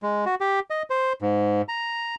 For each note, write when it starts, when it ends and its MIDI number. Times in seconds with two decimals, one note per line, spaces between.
0.03 0.25 56
0.26 0.35 66
0.41 0.60 67
0.70 0.83 75
0.90 1.13 72
1.22 1.62 44
1.68 2.15 82